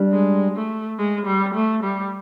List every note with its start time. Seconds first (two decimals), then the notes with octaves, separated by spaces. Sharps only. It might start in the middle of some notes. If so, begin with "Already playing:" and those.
Already playing: G3 D4
0.13 G#3
0.56 A3
0.98 G#3
1.26 G3
1.54 A3
1.83 G3